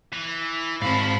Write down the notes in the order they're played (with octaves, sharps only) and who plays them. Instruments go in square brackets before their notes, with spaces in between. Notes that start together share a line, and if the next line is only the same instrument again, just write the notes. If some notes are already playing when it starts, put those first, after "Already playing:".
[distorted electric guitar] E3
[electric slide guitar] G#2 C4 [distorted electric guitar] F5 A5 [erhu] B5